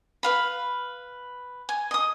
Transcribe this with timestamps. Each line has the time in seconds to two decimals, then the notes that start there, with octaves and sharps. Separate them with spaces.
0.23 B4 F5 B5
1.69 G#5
1.91 D#5 D#6